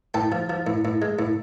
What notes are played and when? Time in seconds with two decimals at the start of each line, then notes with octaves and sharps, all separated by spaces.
0.14 A2 G5 A5
0.32 F3
0.50 F3
0.67 A2
0.85 A2
1.02 G#3
1.19 A2